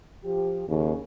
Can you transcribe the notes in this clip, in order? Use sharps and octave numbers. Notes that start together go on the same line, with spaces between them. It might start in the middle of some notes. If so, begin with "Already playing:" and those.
F3 G4
D#2 C#3